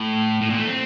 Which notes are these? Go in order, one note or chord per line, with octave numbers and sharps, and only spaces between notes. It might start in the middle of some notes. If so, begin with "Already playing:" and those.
Already playing: A2
A2
A#2
A3
C4